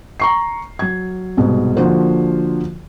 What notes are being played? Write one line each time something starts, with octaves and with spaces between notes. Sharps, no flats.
A#5 C#6 C7
F#3 G#6
C2 G#2 B2
D3 F3 A#3 F#4 C5